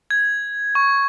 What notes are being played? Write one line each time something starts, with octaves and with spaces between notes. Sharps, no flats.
G#6
C#6